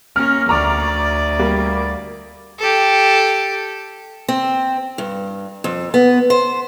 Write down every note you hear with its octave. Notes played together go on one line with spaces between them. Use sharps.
A#3 C#4 F6
D2 D5 A#5 C#6 D6
G3 A#3
G4 A4
C4
G2
F2
B3
C5